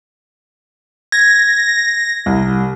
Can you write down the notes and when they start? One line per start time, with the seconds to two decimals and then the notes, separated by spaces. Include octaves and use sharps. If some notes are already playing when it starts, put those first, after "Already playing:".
1.12 G#6 A#6
2.26 C2